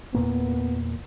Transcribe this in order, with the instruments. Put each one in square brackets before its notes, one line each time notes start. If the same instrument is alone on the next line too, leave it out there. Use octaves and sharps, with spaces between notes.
[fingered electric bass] E2 A#2 A#3 [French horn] B3